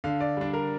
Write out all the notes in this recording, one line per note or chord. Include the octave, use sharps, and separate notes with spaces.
D3 F5
D5
G3 D4
A#4